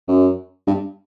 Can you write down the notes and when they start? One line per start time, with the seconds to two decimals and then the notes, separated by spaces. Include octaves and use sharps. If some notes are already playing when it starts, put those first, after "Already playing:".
0.08 F#2
0.67 G2